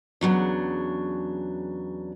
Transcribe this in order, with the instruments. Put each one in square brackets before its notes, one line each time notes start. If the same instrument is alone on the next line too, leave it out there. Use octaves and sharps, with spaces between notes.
[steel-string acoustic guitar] E2 C#3 F#3 D4